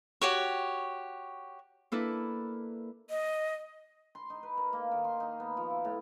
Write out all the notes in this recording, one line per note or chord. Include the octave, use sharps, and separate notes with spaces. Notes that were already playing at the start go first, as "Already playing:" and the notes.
F#4 G4 C#5
A#3 D4 E4 A4 B4
D#5
C6
D#4
B4
A#4
A#3
D#3
C6
D#4
B3
F3
E4
A2